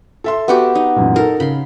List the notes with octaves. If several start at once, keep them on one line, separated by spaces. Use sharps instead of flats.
A4 E5 C6
B3 F#4 G4
D#4
A1 F#2 A#2
D#4 A4 A#4
C#3 B5 C6